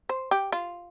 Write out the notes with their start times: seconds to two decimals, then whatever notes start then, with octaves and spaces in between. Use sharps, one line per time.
0.09 C5
0.31 G4
0.52 F4